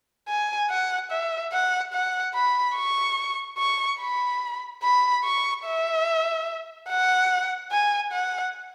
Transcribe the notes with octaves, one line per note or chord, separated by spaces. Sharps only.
G#5
F#5
E5
F#5
F#5
B5
C#6
C#6
B5
B5
C#6
E5
F#5
G#5
F#5